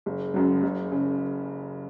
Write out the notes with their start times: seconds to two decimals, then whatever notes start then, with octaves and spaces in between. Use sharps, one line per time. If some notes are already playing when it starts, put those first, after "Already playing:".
0.06 F#1
0.34 F#2 C#3 F#3
0.63 F#1
0.92 C#3